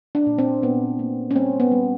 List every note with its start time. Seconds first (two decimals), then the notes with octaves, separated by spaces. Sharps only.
0.15 D4
0.27 A#2
0.38 C4
0.62 A#2 B3
0.99 A#3
1.31 C#4
1.36 G3 C4
1.60 B3
1.71 G3